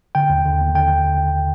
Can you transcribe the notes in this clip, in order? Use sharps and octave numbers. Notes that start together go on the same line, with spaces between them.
D3 G5
D#2
D3
D#2
D3 G5